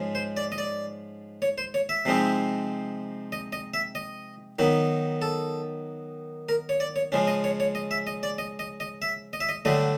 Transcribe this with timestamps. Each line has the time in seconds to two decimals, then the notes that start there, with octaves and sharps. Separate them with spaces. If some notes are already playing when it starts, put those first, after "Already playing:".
Already playing: G#2 F3 G#3 C#4
0.15 C5
0.37 D5
0.52 D#5
0.58 D5
1.42 C#5
1.58 C5
1.74 C#5
1.89 E5
2.05 C3 F3 G#3 C4 D#4
3.32 D#5
3.52 D#5
3.74 E5
3.95 D#5
4.59 D#3 F#3 B3 D#4
5.22 A4
6.49 A#4
6.69 C#5
6.80 D5
6.96 C#5
7.12 C#3 F3 G#3 C#4
7.27 D#5
7.44 C#5
7.60 C#5
7.75 D#5
7.91 E5
8.07 D#5
8.23 D5
8.38 D#5
8.59 D#5
8.80 D#5
9.02 E5
9.33 D#5
9.40 E5
9.49 D#5
9.65 G2 D3 F#3 A3 D#5